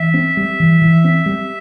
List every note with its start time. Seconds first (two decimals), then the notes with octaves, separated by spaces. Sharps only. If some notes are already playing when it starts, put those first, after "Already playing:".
Already playing: E3 E5
0.14 C4
0.37 G3
0.59 E3
0.81 E3
1.04 C4
1.26 G3